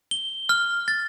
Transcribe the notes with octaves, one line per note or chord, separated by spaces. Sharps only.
G7
F6
A6